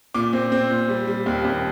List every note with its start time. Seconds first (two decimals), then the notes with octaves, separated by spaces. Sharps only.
0.14 A#2 D6
0.33 C4
0.52 C4
0.70 A#2
0.89 G3
1.08 G3
1.26 D#2
1.45 D#2